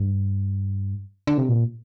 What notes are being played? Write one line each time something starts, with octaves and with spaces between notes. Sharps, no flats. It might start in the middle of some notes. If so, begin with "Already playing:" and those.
Already playing: G2
D3
C3
A#2